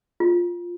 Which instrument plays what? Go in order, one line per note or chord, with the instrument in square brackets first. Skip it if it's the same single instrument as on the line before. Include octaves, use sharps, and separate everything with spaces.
[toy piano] F4